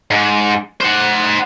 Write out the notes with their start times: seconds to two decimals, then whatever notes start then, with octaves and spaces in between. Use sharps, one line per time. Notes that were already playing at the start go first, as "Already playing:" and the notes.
0.11 G#2
0.80 C5 F#5